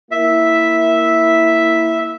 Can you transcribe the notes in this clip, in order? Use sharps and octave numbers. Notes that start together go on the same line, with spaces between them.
A#3 E4 E5